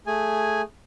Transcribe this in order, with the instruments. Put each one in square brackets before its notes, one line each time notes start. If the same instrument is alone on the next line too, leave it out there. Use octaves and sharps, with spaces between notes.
[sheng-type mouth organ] A3 G#4 G#5